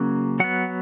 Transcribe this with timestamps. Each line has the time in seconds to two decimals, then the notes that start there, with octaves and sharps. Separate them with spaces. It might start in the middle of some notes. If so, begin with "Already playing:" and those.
Already playing: C#3 F#3 A#3 C#4
0.40 F#3 B3 F#5